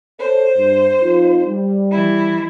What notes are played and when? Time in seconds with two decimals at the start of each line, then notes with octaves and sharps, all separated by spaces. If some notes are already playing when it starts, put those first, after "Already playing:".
0.19 A4 C5 C#5
0.56 G2
1.01 F2 D#4 F4
1.45 G3
1.91 E3 E4